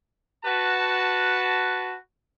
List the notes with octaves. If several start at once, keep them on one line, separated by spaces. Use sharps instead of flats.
F#4 B4 A5